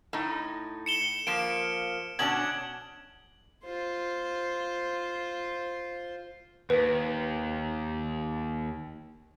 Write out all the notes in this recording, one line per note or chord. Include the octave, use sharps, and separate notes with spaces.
A2 D#4
C#7 E7 G7
F3 A#3 D7 E7
B2 C#4 D4 G#6 F#7
F4 C5
D#2 B4